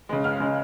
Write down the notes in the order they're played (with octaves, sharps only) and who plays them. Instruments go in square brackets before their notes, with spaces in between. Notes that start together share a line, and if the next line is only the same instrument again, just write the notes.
[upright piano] C#3 G#3
C#2 F6
C#3 G#3